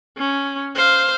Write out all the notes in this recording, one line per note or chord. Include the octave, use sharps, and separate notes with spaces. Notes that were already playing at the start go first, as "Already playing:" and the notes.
C#4
C5 F5